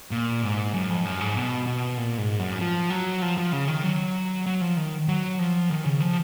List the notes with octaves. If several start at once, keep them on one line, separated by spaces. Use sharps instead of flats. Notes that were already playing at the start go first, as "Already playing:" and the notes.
A#2
G#2
F#2
F2
F#2
G#2
B2
B2
A#2
G#2
F#2
F3
F#3
F3
F3
C#3
D#3
F#3
F#3
F3
D#3
F#3
F3
D#3
C#3
F3